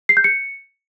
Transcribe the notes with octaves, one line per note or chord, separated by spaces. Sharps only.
C7
G6
C#7